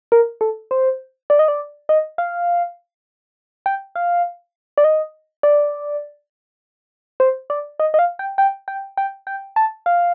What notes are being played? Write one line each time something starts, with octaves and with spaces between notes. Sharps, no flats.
A#4
A4
C5
D5
D#5
D5
D#5
F5
G5
F5
D5
D#5
D5
C5
D5
D#5
D#5
F5
G5
G5
G5
G5
G5
A5
F5